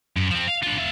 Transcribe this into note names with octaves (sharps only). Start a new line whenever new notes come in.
F#2
F3 C4
F5
D4 F4
F4 E5